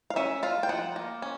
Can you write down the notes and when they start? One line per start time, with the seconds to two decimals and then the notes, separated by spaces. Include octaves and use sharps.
0.10 F5
0.16 C#4 E5
0.43 F4 F5
0.63 G5
0.69 F3 F#5
0.96 A#3
1.22 C#4